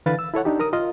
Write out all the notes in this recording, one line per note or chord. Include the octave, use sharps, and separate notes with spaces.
D3 E3 B4 F5 A6
E6
E4 A4 C#5 F#5
D4 D#4 G4
A#4 A#5 D#6
F4 D#5 F5